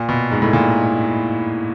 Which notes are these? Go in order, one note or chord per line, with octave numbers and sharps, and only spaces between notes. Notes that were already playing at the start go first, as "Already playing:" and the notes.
Already playing: A#2
B2
G#2
A2
A#2